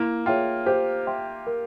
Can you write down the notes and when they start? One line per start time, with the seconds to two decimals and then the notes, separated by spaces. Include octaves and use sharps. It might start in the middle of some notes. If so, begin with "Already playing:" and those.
Already playing: A#3 E4
0.26 F4 G#4 C#5 E5 G5
0.66 G4 C5
1.07 E5 G5 C6
1.47 A#4